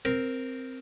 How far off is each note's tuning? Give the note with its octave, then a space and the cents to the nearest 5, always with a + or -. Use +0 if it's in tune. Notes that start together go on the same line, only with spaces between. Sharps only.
C4 +0 A#4 +0